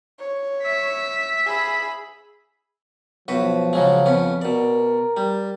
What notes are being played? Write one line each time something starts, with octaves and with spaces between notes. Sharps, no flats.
C#5
E5 B6
G#4 B5
B1 F3 F#4 B4
C#3 F#3 G#3
F2 B3 C#4
B2 A#4 D5
G3